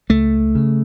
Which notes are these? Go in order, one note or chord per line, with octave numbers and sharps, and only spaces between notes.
C#2 A3
C#3